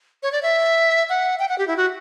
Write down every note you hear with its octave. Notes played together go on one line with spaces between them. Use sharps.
C#5
D5
E5
F#5
G5
F#5
G4
E4
F#4